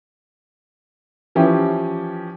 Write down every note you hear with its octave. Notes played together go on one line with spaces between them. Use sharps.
E3 F3 C#4 E4 G4